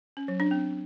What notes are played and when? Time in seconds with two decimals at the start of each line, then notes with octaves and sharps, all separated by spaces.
0.17 C#4
0.28 F#3
0.40 D4
0.51 C4